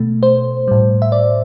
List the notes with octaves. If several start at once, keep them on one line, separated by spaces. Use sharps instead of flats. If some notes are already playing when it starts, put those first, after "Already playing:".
Already playing: B2 A3
C5
A2 G3
E5
D5